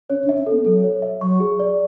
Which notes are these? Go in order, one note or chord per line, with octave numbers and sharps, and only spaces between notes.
C#4 C#5
D4
E5
C#4
A4
B3
F#3 A4
C#5
E5
F#3 C#6
G#4
D5